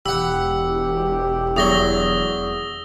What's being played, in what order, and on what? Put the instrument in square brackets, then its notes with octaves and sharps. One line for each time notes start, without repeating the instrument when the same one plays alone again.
[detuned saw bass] E1 [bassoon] G4 [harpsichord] F#5 B5 [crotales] E6
[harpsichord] E2 F#3 [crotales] D#6 A#6 G7